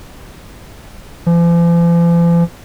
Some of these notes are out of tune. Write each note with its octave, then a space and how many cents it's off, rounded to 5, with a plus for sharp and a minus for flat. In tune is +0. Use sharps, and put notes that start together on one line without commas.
F3 -45